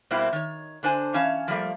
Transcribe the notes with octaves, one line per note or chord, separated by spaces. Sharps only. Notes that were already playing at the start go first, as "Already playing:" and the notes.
B2 G3 A#3 C4 E4 F#4
D#3 C#5
D3 D4 C5 G#5
E3 C#4 C#5 F5 A5
F3 G3 A3 A#3